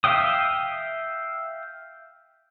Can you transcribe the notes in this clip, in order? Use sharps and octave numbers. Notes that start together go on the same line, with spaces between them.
E5 F5 G5 D#6